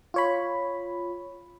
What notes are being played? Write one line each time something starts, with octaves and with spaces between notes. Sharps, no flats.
F4 C#5 B5